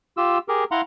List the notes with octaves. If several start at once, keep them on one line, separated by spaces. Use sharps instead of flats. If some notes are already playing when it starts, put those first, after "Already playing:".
F4 G4 E6
G4 G#4 A#4
E4 F5 F#5 A#5 C6